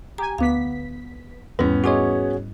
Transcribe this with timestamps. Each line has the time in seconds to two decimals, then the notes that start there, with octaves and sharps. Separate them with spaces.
0.18 G4 G#5 A#5
0.38 D2 B3 F5 D6 B6
1.59 E2 G#2 G3 B3 C#4 E4
1.84 F#4 G#4 C#5 D#5 C6 D6